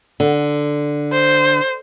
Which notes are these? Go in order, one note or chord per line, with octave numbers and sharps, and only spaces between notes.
D3
C5